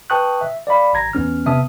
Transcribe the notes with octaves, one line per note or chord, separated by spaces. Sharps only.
B4 G5 A5 C#6 D#6 F#6
E5
D5 F5 B5
G#1 A#5 G#6 A#6
E2 B3 C#4 F6
C3 B3 E5 A5 D#6 F6